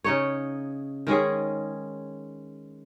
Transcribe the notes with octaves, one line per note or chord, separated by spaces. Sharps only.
C#3 D#4 C#5
D#3 G#3 C#4 G#4